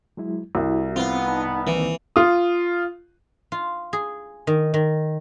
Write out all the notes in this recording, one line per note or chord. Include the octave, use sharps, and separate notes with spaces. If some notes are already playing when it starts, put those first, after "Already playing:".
F#3 G#3 E4
C2 E4 F#4
B3 C4 F4 F5
D#4 A5 B5
D#3 E3 A#3 C4
F4 D#6
F4
G#4
D#3
D#3